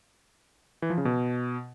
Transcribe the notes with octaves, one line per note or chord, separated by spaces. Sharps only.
E3
F3
C#3
B2